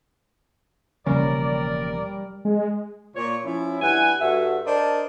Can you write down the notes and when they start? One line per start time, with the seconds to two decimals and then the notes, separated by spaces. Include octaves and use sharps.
1.07 E1 C#3 F3 G3 A#3 A#4 D5
2.45 G#3
3.16 A#2 C#5
3.45 F3 C#4 E4
3.82 G2 E4 F#5 G#5
4.21 G2 F#4 A4 E5 F#5
4.66 D4 A#4 C5 D#5 A5